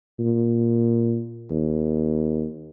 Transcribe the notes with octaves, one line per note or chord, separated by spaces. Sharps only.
A#2
D#2